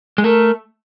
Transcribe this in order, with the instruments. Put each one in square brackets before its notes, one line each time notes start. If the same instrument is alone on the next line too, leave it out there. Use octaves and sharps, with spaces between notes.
[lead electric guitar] G#3
[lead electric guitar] A3 [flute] A#4